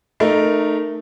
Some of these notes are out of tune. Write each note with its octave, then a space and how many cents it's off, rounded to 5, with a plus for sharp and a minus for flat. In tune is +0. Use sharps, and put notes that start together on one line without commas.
A3 +0 D#4 -25 A#4 +0